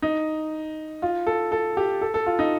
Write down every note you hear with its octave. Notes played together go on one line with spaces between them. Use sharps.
D#4
F4
A4
A4
G4
A4
A4
F4
D#4